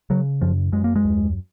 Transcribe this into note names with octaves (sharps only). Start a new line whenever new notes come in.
C#3 F#3
F#2 F3
F#2 G#3
A#3
G#3
D#2